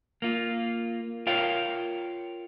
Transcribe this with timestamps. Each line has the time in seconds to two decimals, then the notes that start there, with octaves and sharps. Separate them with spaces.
0.22 A#3 F4
1.27 F4 A#4 C#5 F5 G5